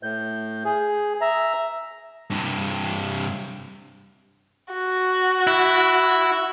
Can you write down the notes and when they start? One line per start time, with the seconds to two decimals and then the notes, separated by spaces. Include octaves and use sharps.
0.03 A2 G6
0.65 G#4
1.21 E5 A#5
2.30 G2 C3
4.74 F#4
5.47 E4